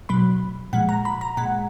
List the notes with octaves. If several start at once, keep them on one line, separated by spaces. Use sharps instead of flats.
B2 F#3 B5
A#2 F3 G#3 F#5
A#5
B5
A#5
A#2 G#3 F#5